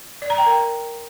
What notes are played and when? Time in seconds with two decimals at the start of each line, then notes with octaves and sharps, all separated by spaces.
0.22 D5
0.30 A#5
0.38 G5
0.46 A#4